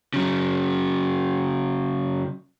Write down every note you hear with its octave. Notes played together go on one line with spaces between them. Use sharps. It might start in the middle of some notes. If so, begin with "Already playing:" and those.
C#3 F#3